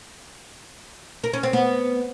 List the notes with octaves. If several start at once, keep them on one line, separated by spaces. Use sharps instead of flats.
A#4
C#4
C4
B3